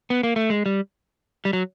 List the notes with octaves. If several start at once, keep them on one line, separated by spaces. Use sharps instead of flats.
B3
A#3
A3
G#3
G3
G3
F#3